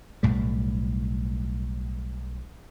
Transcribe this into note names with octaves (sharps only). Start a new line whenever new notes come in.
B1 A2 G3